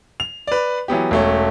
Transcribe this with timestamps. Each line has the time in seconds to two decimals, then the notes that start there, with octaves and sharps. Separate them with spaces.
0.20 F7
0.47 B4 D5
0.88 E3 F#3 B3 G4
1.11 E1 A3 C#4